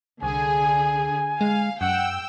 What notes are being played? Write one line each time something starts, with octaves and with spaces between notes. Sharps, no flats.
C2 D3 G#4 G#5
G#3 F5
F#2 F#5 G5 E6